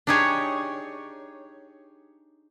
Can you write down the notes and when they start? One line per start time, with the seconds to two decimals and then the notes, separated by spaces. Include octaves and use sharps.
0.07 D4 D#4 G4 G#4 C#5